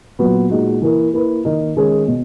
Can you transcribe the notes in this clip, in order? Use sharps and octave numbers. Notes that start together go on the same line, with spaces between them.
A#2 F#3 B3 F#4 B4
A#2 G#3 D#4 F#4
E3 A#3 E4 A#4
A#3 E4 B4
D#3 A#3 D#4 A#4
D#3 G#3 C#4 G#4
B2